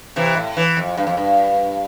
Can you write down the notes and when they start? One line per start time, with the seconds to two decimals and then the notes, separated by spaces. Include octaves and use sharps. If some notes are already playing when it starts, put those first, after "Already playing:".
0.16 C3 E3
0.37 A2
0.57 E3
0.77 F2
0.97 G2
1.07 F2
1.17 G2